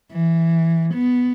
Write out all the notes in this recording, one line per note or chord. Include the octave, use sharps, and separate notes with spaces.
E3
B3